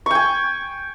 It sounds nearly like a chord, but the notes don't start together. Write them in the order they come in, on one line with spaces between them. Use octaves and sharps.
C#6 G5 G#5